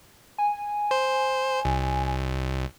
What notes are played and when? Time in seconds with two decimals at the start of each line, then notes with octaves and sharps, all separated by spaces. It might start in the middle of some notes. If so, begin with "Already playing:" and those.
0.38 G#5
0.91 C5
1.65 C2